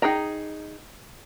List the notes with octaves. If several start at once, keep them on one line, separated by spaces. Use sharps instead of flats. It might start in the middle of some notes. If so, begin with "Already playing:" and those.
D#4 G#4 G5 A#5